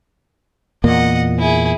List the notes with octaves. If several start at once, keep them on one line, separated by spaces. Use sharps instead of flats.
E2 A#2 A#3 D#5 F#5
E4 G#4